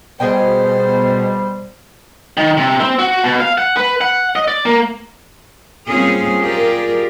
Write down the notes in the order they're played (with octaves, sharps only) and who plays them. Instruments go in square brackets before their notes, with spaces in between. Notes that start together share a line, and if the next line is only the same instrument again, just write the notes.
[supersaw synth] B2 [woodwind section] G3 [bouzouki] G#4 D#5 G5 [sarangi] C5
[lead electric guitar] D#3
C3
C4
F#4
B2
F5
F#5
B4
F#5
D#5
D5
A#3
[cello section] G3 A#3 C4 C#4 F4 G#4
F4 G4 G#4 A#4 D5